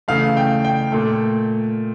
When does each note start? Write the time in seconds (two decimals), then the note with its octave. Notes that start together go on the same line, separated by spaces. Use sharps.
0.08 C#3 E3 A3 F5
0.37 G5
0.65 G5
0.92 A#2 A3